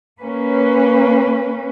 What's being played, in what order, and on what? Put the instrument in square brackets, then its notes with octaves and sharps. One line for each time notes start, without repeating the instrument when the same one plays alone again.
[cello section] A#3 C#4 B4